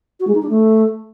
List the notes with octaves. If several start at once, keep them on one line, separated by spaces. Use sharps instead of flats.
F#4
G#3
D#4
D4
A3